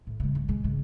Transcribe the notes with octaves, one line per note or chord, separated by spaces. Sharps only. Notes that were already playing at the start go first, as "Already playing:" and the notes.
A2
C#3 G#3
G2
A#1 G#3
G#2 C#3